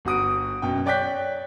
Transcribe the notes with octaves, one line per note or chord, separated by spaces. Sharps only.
G1 F#4 D#6 D7
F#2 B2 G5
C#5 D5 G5 F#6 G6 B6